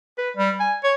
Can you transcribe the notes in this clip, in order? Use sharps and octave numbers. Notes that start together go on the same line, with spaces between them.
B4
G3
G#5
C#5